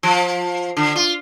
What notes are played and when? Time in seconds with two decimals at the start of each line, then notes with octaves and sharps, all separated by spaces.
0.03 F3
0.77 D3
0.96 F4